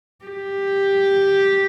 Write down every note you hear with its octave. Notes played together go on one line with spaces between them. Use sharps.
G4